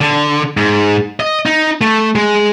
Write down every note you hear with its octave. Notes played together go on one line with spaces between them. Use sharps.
D3
G#2
D#5
D#4
A3
G#3